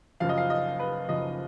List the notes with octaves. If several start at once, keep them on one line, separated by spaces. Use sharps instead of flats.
F#1 F#2 F3 F5
D#5
F5
D#5
B4
F#1 F#2 F3 D#5